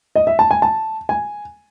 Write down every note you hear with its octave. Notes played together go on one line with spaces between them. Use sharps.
D#5
E5
A5
G#5
A5
G#5